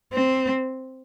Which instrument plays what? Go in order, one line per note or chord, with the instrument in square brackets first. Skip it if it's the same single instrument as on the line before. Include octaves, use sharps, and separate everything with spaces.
[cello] C4